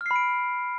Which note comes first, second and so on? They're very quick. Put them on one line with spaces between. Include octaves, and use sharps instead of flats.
F6 C7 B5 D7